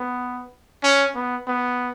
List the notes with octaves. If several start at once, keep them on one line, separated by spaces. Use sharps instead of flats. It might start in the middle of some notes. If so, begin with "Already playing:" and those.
Already playing: B3
C#4
B3
B3